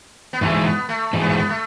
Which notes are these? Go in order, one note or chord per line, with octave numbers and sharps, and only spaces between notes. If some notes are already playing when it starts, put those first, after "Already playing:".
B3
G#2 E3 G#3 A3
B3
A3
G#2 E3 G#3
B3
A3
B3
A3